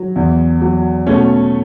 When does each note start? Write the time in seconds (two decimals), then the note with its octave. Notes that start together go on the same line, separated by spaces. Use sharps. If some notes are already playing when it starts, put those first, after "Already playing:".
Already playing: F#3
0.16 E2
0.62 F#3
1.07 B2 A3 C#4